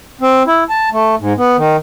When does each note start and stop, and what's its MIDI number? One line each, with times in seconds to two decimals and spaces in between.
0.21 0.43 60
0.47 0.64 64
0.69 0.89 81
0.92 1.15 57
1.20 1.33 44
1.38 1.57 59
1.57 1.77 51